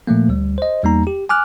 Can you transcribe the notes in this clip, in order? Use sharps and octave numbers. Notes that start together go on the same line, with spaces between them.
A#2 F3 A3 A#3
D2 G3
C5 D#5
E2 G3 A#3 D#4 A#5
G4
G#5 D6 F6 F#6